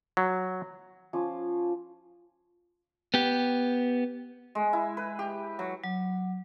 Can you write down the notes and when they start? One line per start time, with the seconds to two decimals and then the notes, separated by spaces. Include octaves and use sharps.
0.17 F#3
1.13 F3 C#4 D6
3.14 B3 G4
4.55 G#3
4.73 E4
4.97 B4
5.19 G4
5.59 F#3
5.84 F#3